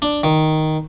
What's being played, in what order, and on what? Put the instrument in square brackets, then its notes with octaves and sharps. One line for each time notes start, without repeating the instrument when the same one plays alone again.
[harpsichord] D4
D#3